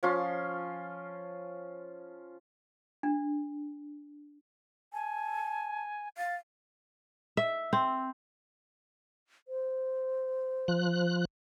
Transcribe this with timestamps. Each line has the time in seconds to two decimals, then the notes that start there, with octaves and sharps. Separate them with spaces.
0.03 F3 C#4 F4 C6
3.03 D4
4.93 G#5 A5
6.18 F5 A6
7.37 E5
7.73 C4
9.48 C5
10.68 F3 F#6